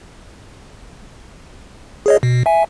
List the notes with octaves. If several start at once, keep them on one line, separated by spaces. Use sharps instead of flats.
G#4 C#5 D#5
B2
E5 G#5